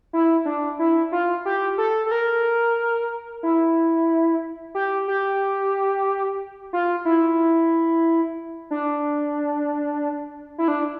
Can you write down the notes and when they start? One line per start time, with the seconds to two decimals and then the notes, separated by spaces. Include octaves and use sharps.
0.13 E4
0.45 D4
0.79 E4
1.12 F4
1.45 G4
1.78 A4
2.06 A4
2.11 A#4
3.43 E4
4.75 G4
5.08 G4
6.73 F4
7.05 E4
8.71 D4
10.58 E4
10.68 D4